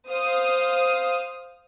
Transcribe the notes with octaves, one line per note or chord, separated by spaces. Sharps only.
C5 F5 D#6